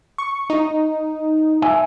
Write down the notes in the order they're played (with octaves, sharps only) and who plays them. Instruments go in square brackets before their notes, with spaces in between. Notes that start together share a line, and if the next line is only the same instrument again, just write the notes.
[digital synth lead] C#6
D#4
[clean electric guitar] E5 G#5